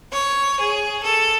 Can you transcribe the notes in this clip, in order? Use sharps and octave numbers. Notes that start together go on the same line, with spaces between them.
C#5
G#4
A4